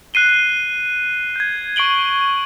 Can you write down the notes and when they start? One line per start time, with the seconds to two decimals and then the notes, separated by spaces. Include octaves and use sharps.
0.14 F#6 C7 D#7 G7
1.36 G6 G#6
1.76 C#6 C7 D7 F#7 G7